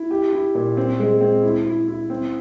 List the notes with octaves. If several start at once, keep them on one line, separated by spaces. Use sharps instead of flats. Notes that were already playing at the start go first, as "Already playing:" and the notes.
Already playing: E4
G4
E4
A#2
C4
G#3
C4
E4
E4
E4
C4